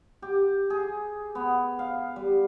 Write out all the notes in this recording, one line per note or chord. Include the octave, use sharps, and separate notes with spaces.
G4
G#4
B3
F5
G3